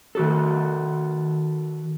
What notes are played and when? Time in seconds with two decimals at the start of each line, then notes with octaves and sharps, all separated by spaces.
0.15 D#3 F#4 A4